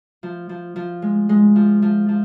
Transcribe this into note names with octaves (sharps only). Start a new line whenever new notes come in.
F3
F3
F3
G#3
G#3
F3
F3
F3